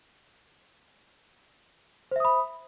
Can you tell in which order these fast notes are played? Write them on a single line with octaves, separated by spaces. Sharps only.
C5 E5 D#6 B5